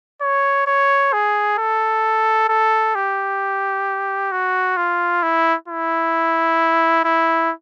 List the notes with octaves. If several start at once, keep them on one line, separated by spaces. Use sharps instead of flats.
C#5
C#5
G#4
A4
A4
G4
F#4
F4
E4
E4
E4